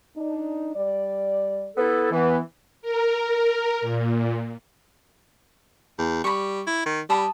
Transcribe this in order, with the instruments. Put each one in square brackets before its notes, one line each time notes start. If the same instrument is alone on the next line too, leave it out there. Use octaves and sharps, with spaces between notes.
[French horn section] D4 D#4
G3 D5
[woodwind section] B3 E4 A4
[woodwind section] E3 [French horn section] B3
[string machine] A#4
A#2
[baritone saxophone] E2
[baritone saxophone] G3 [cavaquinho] B5 C#6
[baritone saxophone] E4
D#3
[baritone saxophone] G3 [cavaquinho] A5 B5 D#6